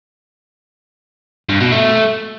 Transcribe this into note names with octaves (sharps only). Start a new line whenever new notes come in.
G2
B2
A3